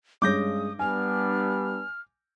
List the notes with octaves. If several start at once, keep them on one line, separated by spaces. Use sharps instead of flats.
G2 G#3 C#4 D6 D#6 G6 A#6
G3 B3 D4 G#5 F6